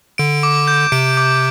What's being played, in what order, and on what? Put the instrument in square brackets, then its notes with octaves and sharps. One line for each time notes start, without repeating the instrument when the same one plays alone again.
[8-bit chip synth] D3 [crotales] D7
[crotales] D6
G6
[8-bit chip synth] C3 [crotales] D7
[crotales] D6